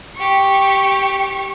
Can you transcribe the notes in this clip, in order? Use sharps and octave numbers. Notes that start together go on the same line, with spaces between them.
G4 C#6